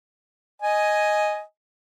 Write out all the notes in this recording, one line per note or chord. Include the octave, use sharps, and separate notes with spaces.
D#5 G#5